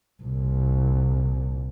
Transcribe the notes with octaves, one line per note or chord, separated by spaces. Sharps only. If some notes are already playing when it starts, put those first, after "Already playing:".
C2 A#2